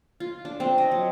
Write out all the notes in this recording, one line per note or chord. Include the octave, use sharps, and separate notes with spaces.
F4
D4
C4
D#5
F#3